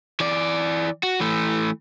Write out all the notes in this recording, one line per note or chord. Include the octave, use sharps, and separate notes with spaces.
E3 D5
F#4
E3 A3